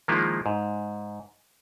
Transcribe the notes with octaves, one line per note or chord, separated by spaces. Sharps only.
D#3 F3 G#3 A#3 E4 F4
G#2